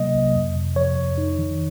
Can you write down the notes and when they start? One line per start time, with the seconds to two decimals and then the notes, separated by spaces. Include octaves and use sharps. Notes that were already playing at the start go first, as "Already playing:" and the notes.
Already playing: C3 F#3 A#3 D#5
0.14 C2
0.35 F2
0.55 C3
0.76 F3 C#5
0.97 F2
1.18 D#4
1.38 D#3